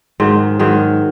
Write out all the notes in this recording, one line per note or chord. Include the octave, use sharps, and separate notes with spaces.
G#2 D#3 F#3
G#2 D#3 F#3